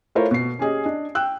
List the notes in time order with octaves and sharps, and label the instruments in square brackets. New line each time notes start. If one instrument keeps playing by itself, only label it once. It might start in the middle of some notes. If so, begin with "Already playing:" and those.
[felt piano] A3 E4 F4 A#4 C5 C#5
B2 C7
C#4 G4 G#4 D#5
D4 D#5
G5 E6 F#6